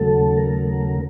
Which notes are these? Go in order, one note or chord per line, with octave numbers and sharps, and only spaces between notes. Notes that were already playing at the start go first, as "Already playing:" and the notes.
Already playing: D#2 C#3 F#3 A3 A4
A#4